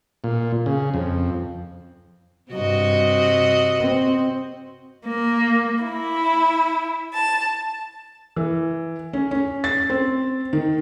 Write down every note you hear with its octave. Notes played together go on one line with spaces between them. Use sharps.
A#2
C#3
F2
G2 C3 F#4 D#5
C4
A#3
E4
A5
E3
C#4
C#4
A6
C4
D#3